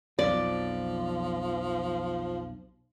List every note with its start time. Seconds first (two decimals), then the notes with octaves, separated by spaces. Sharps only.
0.19 B1 F2 F3 D5